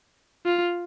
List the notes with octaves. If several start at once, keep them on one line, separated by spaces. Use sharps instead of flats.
F4